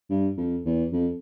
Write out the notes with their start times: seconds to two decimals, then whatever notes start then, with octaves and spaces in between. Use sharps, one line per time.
0.10 G2
0.37 F2
0.65 E2
0.92 F2